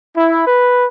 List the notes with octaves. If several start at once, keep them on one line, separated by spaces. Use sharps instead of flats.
E4
B4